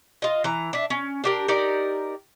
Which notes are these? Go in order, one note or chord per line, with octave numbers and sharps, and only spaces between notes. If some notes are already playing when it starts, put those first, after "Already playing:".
F4 D#5
E3 A#5
D4 E5
C#4
D4 G4 A#4
D#4 G4 A#4 D5